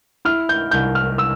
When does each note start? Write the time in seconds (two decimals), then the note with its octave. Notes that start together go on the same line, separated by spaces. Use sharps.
0.25 E4 F6
0.49 G6
0.71 C2 G6
0.95 F6
1.18 E6